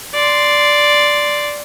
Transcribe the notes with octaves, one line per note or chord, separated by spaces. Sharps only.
D5 C6